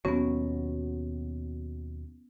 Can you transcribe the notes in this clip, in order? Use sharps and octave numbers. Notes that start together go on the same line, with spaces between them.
D#2 B2 F#3 B3 C#4